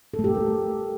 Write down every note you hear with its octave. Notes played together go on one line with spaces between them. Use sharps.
A4
A3
G4
A3
A#4